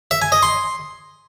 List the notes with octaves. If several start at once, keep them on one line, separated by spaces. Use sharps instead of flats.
E5
G#5
D#5
C6